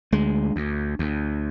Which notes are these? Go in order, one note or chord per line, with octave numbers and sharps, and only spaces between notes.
D2 G#3
D2
D2